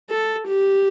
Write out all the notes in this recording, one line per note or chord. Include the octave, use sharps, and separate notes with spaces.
A4
G4